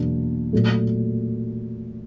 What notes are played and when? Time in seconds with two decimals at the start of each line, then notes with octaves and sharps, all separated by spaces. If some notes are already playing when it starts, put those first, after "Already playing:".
Already playing: E2 B2 F#3 A#3 D4
0.53 A#2 F#3 A3